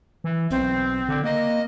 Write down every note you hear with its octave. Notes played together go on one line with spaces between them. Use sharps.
E3
B1 C4
D3
A#3 D#5